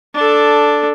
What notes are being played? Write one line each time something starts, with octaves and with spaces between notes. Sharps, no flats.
D4 A4